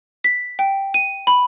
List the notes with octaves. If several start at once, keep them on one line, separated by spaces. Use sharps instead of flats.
B6
G5
D#7
B5